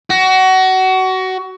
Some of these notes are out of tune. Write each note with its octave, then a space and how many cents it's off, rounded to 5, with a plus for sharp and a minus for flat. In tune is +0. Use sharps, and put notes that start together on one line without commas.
F#4 +25